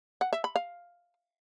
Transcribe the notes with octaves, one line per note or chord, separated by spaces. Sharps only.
F#5
E5
B5
F5